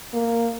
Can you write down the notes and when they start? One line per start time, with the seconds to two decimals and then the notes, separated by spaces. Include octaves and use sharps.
0.14 A#3